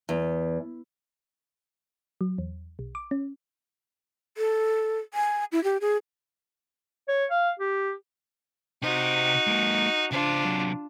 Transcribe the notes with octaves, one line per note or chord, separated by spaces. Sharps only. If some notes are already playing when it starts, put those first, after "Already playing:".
E2
F#3
E2
B1
D6
C#4
A4
G#5
E4
G4
G#4
C#5
F5
G4
C3 D#4 F#4 C5
G#3 A#3
C#3 D4 F4 C5
C3 F#3